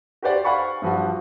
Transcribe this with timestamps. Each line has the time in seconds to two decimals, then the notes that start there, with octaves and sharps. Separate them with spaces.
0.22 F#4 G4 B4 C5 D5 F#5
0.44 F5 F#5 G#5 B5 C#6
0.82 G2 F3 F#4